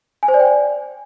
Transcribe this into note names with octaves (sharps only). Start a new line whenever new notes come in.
G#5
C5
D5
G5
D5